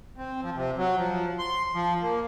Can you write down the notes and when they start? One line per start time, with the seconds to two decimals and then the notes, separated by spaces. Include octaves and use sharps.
0.17 C4
0.42 F3
0.55 C3
0.78 F#3
0.97 F3
1.39 C6
1.74 F3
2.03 A#3